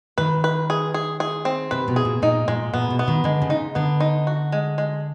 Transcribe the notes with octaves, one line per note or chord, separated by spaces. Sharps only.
D#3 B4
B4
G#4
G#4
G#4
C4
C3 B4
B2
G#4
A#2
A#2 D#4
A#2 G#3
A#2 B3
B2
B3
D#3
D3 G#3
C#3
D#4
D3 B3
D#4
F#4
G#3
G#3